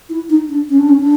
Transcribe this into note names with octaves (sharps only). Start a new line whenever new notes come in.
E4
D#4
D4
C#4
D4
C#4
D4